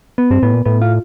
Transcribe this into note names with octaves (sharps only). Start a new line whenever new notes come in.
B3
G2 C4
A2 B3
A#2
A2 B3
F4